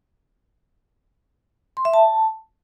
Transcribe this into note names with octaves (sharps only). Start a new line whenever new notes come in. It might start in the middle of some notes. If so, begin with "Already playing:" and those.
C6
E5
A5